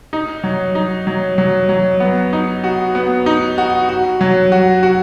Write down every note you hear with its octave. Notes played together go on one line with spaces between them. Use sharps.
D#4
F#3
D#4
F#3
F#3
F#3
B3
D#4
F#4
B3
D#4
F#4
F#4
F#3
F#4
F#4